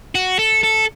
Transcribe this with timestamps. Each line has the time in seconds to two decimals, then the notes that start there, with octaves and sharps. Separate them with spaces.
0.15 F#4
0.39 A4
0.64 A4